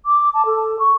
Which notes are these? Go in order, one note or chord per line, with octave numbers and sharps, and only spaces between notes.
D6
A5
A4
C#6